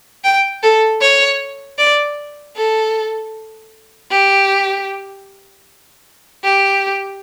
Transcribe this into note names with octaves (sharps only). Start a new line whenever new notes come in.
G5
A4
C#5
D5
A4
G4
G4